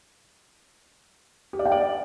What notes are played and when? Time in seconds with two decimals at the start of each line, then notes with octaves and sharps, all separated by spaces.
1.53 G4
1.59 D5
1.65 G5
1.72 D5